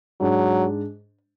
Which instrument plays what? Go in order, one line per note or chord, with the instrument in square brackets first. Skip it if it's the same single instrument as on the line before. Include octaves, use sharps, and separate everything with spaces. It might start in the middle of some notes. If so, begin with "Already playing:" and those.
[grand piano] G#2 G#3 D4 [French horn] F#3